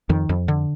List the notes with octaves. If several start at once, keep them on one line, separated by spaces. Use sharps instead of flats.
F2 D#3
F2
D3